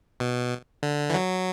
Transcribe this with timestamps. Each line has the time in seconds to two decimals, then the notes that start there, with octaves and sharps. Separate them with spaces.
0.20 B2
0.83 D3
1.10 E3
1.14 F#3